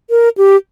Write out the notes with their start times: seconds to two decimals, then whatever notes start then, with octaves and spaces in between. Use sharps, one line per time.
0.10 A#4
0.38 G4